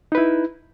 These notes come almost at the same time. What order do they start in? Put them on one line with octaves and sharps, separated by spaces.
D#4 B4 E4